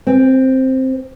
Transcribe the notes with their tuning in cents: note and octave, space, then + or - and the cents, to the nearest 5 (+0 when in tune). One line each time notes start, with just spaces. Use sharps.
C4 +5